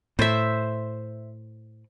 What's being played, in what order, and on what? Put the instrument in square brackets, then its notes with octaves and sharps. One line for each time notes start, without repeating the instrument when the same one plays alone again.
[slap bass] A2 [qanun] C5 E5